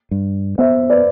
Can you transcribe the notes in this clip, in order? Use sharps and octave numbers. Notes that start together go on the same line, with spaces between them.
G2
B3 C5 E5
B4 D5